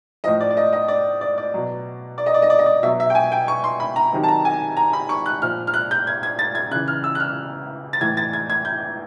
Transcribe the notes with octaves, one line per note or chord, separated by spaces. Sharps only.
A2 F3 D#5
D5
D5
D#5
D#5
D5
D5
D5
B2 F#3
D5
D#5
D5
D#5
D5
D#5
D5
B2 F#3 E5
E5
G5
G#5
G5
C#6
C6
B5
A#5
C3 D#3 F#3
A5
A#5
G#5
A#5
B5
C#6
F#6
A#2 F3 F6
F6
F#6
G6
G#6
G#6
A6
G#6
C#3 E3 F#6
F6
E6
F#6
F6
A6
A2 E3 G#6
A6
G#6
G#6
G6